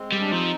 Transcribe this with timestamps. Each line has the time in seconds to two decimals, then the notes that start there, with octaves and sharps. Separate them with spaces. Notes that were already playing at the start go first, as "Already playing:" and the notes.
Already playing: G#3 C4
0.12 G3
0.20 D4
0.31 F3 C4 D#4